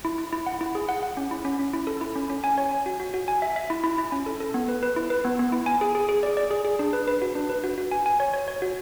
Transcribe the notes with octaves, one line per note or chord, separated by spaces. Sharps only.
E4
E4
E4
F#5
E4
G#4
F#5
F#5
C#4
E4
C#4
C#4
E4
A4
E4
C#4
C#4
G#5
C#5
G#5
F#4
F#4
F#4
G#5
E5
E5
E4
E4
E4
C#4
A4
A4
B3
B4
B4
E4
B4
B3
B3
E4
G#5
G#4
G#4
G#4
D5
D5
G#4
G#4
D4
B4
B4
F#4
D4
B4
F#4
F#4
G#5
G#5
C#5
C#5
C#5
F#4